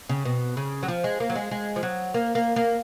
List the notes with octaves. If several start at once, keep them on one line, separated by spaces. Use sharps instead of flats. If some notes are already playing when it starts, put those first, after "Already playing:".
C#3
B2
C#3
F#3
F3
G#3
A#3
F#3
G#3
G#3
F3
F#3
A#3
A#3
A#3